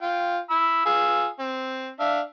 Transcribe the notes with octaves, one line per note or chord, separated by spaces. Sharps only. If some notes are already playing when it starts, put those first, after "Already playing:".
F4 G5
B5 E6
F4 G#4 E6
C4
D4 E5 F5